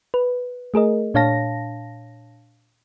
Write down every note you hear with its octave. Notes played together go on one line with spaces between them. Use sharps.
B4
A3 G#4 A#4 D#5
A#2 D4 C#5 F5 A5 A#6